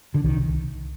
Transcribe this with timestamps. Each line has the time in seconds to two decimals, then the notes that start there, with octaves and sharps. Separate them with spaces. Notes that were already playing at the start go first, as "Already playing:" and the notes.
0.14 D3
0.24 C2 D#3